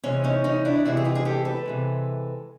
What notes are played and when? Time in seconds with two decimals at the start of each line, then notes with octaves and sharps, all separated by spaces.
0.04 C3 E3 G#3 C#4
0.24 C#4 D#4
0.44 C#4 D#4
0.65 D4 E4
0.85 C3 E3 G#3 E4 F#4
0.97 G#4
1.04 F4 G4
1.15 G#4
1.25 G4 A4
1.45 A4 B4
1.66 C3 E3 G#3